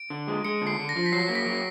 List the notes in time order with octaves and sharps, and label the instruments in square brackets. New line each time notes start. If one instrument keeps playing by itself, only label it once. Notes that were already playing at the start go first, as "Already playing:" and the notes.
Already playing: [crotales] D7
[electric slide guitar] D3
G#3
[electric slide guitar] G#3 [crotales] C#7
[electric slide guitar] D3
[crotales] C7
[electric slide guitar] D3
[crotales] A#6
[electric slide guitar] F3
[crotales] B6
[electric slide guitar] F#3 [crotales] C7
[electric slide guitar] A#3
[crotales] B6
[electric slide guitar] F#3